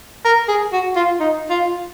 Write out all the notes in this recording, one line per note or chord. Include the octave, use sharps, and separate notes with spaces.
A#4
G#4
F#4
F4
D#4
F4